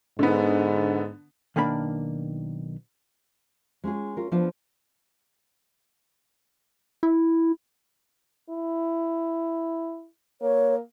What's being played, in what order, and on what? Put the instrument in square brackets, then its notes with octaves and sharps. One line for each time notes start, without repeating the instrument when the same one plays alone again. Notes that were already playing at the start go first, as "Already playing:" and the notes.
[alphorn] G#2 [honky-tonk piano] D3 B3
[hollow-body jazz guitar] B1 D#3 A#3 D4 B5
[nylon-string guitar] G#3 C#4 F4 G#4
C#4 F4 A#4
F3 B3 D4 F4 C5
[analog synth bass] E4
[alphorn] E4
[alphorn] A#3 [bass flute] C#5